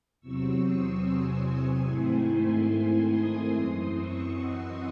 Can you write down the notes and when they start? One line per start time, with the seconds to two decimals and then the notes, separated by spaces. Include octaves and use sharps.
0.21 E2 C3 F#3 C4 C#6 E6
0.62 C6 D#6
1.04 G#5 C6
1.45 G#5 C6
1.86 G#2 D#3 A3 C4 E4
2.27 G#5 C6
3.10 C6 D#6
3.51 F#2 E3 C4
3.93 C#6 E6
4.34 D#5 F#5